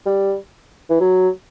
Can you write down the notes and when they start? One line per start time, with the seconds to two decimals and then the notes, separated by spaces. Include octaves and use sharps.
0.06 G3
0.90 E3
1.01 F#3